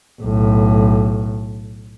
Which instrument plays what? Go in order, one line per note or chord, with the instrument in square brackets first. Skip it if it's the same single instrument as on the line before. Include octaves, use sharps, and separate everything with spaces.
[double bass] B1 A2